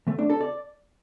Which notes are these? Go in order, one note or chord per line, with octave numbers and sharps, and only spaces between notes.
A3
D4
A4
D5